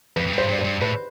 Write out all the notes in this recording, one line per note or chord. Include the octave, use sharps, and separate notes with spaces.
F2 B4
F2
G2
C5
G2 D5
C5
G2
A2 B4